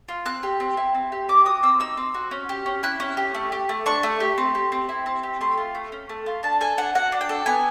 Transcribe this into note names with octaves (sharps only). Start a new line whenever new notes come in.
F4
C4 F#6
G4
C4
E4
C4
G4
C4 D6
F#4 D#6
C4 E6
D#4 E6
C4
F#4
C#4
G4
C#4
E4 F#6
C#4
G4
A3
G4
A3
D4 C#6
A3
G4
C4
G4
C4
E4
C4
G4
A3 C6
F4
A3
C#4
A3
F4
D4 A5
A4 G#5
D4 F#5
F#4 F#5
D4
G5
A4
B3 G#5